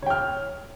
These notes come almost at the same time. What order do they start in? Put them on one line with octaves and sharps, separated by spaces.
C#5 G5 F6